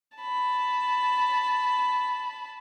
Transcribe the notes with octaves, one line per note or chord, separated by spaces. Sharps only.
A5 B5